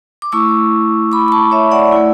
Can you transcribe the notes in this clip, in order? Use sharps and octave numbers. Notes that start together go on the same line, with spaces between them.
D6
A3 E4 C#6 E6
B5 D6
B5
A5 C#6
C#5 E5
D5 F#5
A3 E4